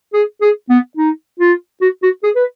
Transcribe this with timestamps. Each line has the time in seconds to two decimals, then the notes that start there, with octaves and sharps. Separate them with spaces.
0.13 G#4
0.41 G#4
0.69 B3
0.97 D#4
1.39 F4
1.81 F#4
2.03 F#4
2.23 G#4
2.35 B4